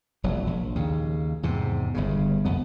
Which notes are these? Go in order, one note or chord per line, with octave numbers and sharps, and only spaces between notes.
E1 A#1 F#3
A#1
D#2 C#3
E2 G#2 C3
G1 G2 C#3
C2 F2 B3